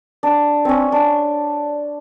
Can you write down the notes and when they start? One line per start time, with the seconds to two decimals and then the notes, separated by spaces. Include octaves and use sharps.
0.23 D4
0.65 C4 C#4
0.92 D4